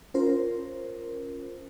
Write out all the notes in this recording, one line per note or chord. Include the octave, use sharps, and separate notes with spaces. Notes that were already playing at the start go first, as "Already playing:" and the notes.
C#4 F4 A#4 C5